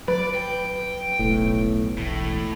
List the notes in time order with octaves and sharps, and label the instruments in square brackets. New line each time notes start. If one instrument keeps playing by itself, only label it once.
[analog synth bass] F#3 [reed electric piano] B4 [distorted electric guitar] D5
[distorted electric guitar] G5
[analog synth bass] E1 [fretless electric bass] B1 A2
[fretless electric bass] E1 [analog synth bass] B1 [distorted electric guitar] A2